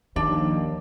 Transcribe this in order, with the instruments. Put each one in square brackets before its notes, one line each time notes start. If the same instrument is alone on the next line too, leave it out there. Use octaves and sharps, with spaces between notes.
[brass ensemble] D#2 [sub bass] D#3 [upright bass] F3 [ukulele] D4